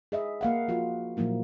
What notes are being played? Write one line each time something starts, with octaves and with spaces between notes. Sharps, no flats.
G#4 D#5 E5
A#3 F5 F#5
F3 F4 F#4
A#2 F3 F#3 A#3 E4